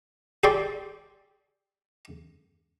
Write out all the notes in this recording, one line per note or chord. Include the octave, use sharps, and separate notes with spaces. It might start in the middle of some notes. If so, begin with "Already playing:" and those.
G4 G#4 C#5 D5 C6